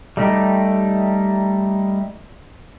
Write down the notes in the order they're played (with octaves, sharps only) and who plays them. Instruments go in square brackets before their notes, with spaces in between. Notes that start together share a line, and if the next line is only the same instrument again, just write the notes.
[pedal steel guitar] G3 A3 D#4 G4